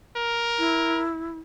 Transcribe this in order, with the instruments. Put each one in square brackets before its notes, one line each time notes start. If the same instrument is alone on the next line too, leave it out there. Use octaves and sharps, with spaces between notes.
[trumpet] A#4
[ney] E4